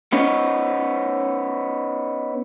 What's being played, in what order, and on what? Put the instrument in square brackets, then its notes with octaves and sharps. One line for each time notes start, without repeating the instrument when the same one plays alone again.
[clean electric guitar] B3 C#4 D#4